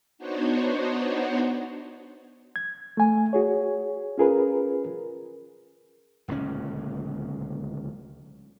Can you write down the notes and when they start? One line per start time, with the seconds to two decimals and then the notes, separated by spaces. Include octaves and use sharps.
0.18 B3 D4 D#4 F#4 C5 C#5
2.56 G#6
2.97 A3 G#5
3.33 F#4 G#4 C#5
4.18 C#4 F4 G#4 A#4 B4
6.28 D1 C#2 A#2 C#4